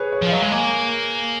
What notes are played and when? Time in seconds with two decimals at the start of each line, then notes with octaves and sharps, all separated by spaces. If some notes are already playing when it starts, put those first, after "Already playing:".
Already playing: G#4 B4 C#5
0.12 C#5
0.22 F3 F5
0.32 F#3 D#5
0.42 G#3
0.52 A#3 G#5